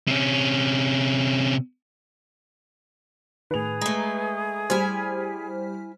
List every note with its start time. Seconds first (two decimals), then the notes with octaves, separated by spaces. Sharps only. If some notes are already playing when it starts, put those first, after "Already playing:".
0.08 C3 C#4
3.51 A2 D#3 G#4 B4 F7
3.81 G#3 A3 A#5 D#6
4.70 G3 E4 C5 G#5 F6 G#6 B6